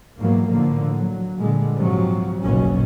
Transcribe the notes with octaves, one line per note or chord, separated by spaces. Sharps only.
G#2 B2 E3 F#3 A#3
A2 D3 F3 A#3
F#3
A#2 D3 G3 G#3
G#2 C3 F3 F#3
F#1 B1 F#2 B2 C#4